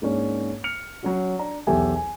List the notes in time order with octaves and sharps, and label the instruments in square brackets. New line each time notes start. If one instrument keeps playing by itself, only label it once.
[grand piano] G#2 A#3 C#4 D4
F6 C#7 F7
F#3 C#4 F#4
D4 A#5
B1 E2 G4 A4 E5 G#5
G#5